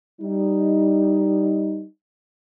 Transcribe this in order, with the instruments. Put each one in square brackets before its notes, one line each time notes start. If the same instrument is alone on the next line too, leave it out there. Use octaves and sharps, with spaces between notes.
[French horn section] G3 D#4